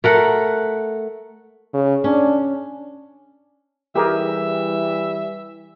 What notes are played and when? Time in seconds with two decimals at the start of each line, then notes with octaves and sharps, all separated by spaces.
0.04 A3 A#4 F#5
1.74 C#3
2.04 C#4 D4
3.95 E3 G3 G4 G#4 A#4 E5